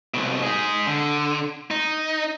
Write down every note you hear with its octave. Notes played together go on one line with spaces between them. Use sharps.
C2 B2
D#4 G#4
D3
D#4